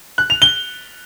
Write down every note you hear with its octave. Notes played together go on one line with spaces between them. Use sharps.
F#6
F7
G7